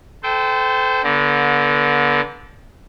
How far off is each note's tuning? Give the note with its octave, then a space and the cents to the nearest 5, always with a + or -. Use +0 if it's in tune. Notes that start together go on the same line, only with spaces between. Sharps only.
A4 -15 C5 -30 G5 +0
D3 -25 B3 -45